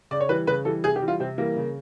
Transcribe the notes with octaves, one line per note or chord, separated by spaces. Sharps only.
C#3 D5
C#5
E3 G3 B4
C#3 B4
E3 G3 A4
C3 G#4
G4
E3 G3
F4
C3 C4
E3 G3 A#3
C#3